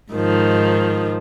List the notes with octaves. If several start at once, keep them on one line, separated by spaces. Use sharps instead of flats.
G#2 D#3 F3